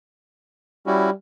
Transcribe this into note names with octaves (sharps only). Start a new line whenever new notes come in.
G3 C#4 E4 F#4